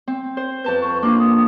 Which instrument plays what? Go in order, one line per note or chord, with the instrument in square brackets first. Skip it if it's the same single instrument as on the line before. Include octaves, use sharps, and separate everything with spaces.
[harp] C4
C5
[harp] F2 A5 G6 [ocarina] B4
[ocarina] C#6
[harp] A#3 D4 F4 [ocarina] D6
[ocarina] D#6